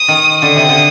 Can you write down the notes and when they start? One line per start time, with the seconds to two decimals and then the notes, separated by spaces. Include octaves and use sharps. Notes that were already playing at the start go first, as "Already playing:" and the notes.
Already playing: D#6
0.08 D#3
0.42 D3 D#6
0.56 C3
0.69 D3